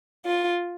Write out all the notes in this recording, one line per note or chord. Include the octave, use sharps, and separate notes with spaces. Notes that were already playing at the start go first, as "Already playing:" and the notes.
F4